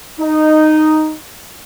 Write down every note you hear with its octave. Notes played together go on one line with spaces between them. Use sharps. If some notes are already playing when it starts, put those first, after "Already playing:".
D#4